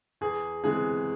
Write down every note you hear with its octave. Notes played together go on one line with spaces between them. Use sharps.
E2 G#4
C3 E3 G#3 B3 G#4